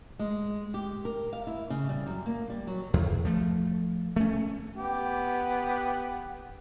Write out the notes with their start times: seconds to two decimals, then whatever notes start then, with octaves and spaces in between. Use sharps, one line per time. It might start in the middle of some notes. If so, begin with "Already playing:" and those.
0.19 G#3
0.74 G4
1.05 A#4
1.33 F5
1.47 E4
1.70 C#3
1.89 G3
2.07 F#2
2.26 A#3
2.50 G3
2.67 F#3
2.94 E2
3.25 F3 A3
4.16 A3 C#4
4.76 B3 G4